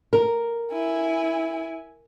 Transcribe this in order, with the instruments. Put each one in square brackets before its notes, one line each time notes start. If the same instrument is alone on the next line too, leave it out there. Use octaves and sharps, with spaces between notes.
[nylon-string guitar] A#4
[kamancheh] E4 G#5